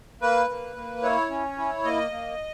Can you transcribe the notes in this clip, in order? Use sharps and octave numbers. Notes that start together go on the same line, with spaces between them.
A#3 B4
A#3
A#3
E4 C#5
C#4
E4
A#3 D#5
A#3